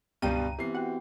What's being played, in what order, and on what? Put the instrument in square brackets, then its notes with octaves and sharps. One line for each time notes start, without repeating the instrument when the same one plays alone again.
[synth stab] C#2 G5 D#7 [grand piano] G2 B2 G3 [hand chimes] A#5
[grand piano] E3 C7 [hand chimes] B3 C4 G4
[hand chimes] F#4 G5 [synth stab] F#5